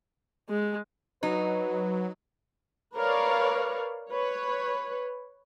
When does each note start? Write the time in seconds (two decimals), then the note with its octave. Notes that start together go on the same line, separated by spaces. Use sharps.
0.49 G#3
1.23 F#3 D#4 B4
2.96 A#4 B4 C#5 D5 F5
4.11 B4 C#5